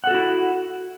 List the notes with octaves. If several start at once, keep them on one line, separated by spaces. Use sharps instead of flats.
E4 F#4 A4 F#5